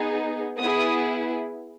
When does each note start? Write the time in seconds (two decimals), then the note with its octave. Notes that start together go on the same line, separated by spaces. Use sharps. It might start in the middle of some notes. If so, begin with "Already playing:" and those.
Already playing: B3 D#4 G#4
0.59 B3 E4 G#4 D#6